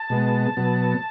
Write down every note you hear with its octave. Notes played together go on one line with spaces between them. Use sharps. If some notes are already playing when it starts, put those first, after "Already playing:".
Already playing: A5
B2 G#3 B3
B2 F#3 B3